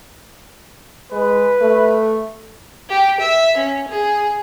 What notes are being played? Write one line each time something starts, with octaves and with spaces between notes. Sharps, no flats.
G#3 B4
A3
G4
E5
C#4
G#4